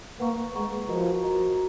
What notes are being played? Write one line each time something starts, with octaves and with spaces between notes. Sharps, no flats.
A#3 B4 F#5 A#5 C#6
G#3 B4 F#5 A#5 C#6
F3 F#4 A#4 D#5 A#5
F#4 A#4 D#5 A#5